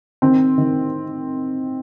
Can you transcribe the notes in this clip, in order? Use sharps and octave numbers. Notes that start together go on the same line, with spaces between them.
D#3 C4
D#3